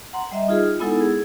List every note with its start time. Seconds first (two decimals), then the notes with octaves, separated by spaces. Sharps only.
0.13 F#5 A#5 C6
0.31 G3 D#5 E5
0.48 D#4 F4 G#4
0.79 G#3 B3 D#4 E4 A4 F#5
1.00 G#4